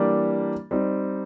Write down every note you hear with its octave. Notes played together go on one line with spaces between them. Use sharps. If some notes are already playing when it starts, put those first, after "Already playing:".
Already playing: E3 G3 A#3 D4 G4
G3 C4 D#4